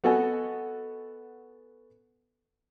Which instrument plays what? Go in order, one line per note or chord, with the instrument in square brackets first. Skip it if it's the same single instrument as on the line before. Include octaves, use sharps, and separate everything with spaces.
[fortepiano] B3 F#4 A4 D#5 G#5